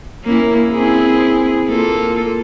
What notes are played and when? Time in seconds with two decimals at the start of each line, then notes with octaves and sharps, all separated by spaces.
0.24 A#3 C#4 E4
0.71 C4 E4 G#4
1.66 A#3 F4 A4